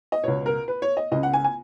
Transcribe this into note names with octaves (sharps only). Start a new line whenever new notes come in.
D#5
C#2 B2 C#5
A#4
B4
C#5
D#5
C#2 C#3 D#5
F#5
G#5
G#5